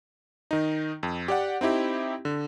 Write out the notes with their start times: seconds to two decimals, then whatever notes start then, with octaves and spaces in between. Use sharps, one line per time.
0.51 D#3 D#4
1.03 F2
1.28 G4 D5 F#5
1.61 C4 D#4 E4 G4
2.25 D3